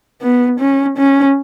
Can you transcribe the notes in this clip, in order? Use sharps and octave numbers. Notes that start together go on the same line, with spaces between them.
B3
C#4
C#4